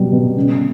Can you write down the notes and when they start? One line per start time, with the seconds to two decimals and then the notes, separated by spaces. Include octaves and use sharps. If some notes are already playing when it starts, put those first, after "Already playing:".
Already playing: B2 F#3 G3
0.12 B2
0.36 C#3